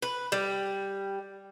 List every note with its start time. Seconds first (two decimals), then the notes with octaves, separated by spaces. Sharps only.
0.02 B4
0.32 G3